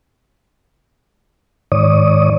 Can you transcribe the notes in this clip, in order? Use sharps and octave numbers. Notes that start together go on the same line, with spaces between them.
G#2 D#3 C#5 D5 D#6